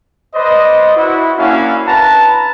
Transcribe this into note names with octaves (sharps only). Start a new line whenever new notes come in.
B4 C5 D5 D#5
E4 F#4
A#3 C#4 D4 E4 F#4 F5
B4 A5 A#5